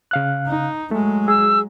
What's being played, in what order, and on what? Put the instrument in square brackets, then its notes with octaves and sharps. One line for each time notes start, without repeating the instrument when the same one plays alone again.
[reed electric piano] C#3 F5 F#6
[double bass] D#4
[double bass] F#3 G#3 [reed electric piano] A3
[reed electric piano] G#4 [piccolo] E6